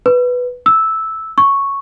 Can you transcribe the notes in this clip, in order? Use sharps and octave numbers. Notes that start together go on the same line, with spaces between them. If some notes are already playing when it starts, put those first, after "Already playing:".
B4
E6
C#6